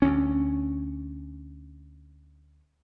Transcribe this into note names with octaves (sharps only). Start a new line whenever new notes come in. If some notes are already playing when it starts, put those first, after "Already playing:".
D2 C#4